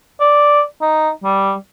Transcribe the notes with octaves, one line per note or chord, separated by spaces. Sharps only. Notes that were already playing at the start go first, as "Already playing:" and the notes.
D5
D#4
G3